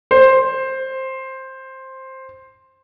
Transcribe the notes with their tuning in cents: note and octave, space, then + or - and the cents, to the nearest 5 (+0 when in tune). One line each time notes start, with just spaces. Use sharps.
C5 +10